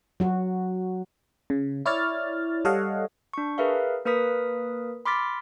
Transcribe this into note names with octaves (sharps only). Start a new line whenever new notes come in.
F#3 F#4
C#3
E4 C#5 D5 F6 A6
G3 A4 C#5 D#5 F5 F#5
D4 C#6
G#4 A#4 B4 E5 F5
A#3 A#4 B4 D#6 B6
B5 C6 D6 F6 A6 B6